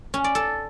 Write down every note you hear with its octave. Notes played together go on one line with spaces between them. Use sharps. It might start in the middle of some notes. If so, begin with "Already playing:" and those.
C#4
D5
A4